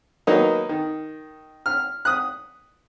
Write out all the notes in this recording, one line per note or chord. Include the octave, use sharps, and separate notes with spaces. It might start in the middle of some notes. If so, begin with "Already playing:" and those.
D#3 F#3 A#3 B3 D#4
D#3
F6
D#6 F#6